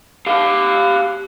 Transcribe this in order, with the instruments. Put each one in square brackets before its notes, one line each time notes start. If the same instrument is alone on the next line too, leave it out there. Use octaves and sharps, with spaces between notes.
[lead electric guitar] G4 F5